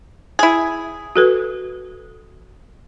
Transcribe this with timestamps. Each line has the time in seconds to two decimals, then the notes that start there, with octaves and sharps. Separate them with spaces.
0.39 E4 G#4
1.16 F#4 A4 B4